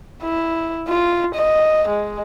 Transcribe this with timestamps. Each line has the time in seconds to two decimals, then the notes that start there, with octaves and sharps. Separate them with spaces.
0.23 E4
0.88 F4
1.35 D#5
1.89 G#3